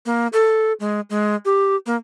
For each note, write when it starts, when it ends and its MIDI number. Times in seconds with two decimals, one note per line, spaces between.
0.06 0.27 58
0.33 0.73 69
0.80 1.00 56
1.10 1.35 56
1.45 1.76 67
1.86 1.96 58